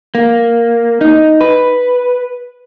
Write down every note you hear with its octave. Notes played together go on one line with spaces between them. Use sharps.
A#3
D#4
B4